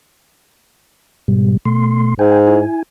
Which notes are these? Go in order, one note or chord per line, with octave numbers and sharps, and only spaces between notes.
G#2 B2 G3
B2 A3 C6
G#2 G5 G#5
E4 G#5